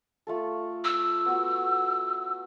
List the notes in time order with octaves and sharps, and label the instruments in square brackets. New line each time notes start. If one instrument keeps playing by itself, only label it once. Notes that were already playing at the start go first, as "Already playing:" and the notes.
[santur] A3 F4 A4
[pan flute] E6
[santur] B3 F#4